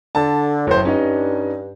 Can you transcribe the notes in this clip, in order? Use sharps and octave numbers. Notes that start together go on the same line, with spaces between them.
D3 A5
F#1 A2 C5
G2 C#4 D#4 D#5